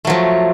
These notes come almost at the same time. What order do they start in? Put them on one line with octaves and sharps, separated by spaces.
A3 F#3 F3